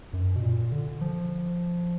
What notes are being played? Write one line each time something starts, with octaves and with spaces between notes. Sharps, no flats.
F#2
B2
A#2
D3
F3